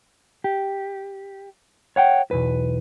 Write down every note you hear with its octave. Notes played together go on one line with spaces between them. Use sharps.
G4
C#5 F#5 G5
B1 E2 B4